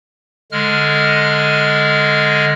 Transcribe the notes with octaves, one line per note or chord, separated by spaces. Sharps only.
D3 G#3 F6